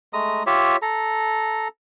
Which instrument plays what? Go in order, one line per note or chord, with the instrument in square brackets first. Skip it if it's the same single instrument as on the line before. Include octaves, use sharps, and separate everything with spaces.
[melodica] G#3 A3 A#5 D#6
F4 G4 C#5 E5
A4 A#5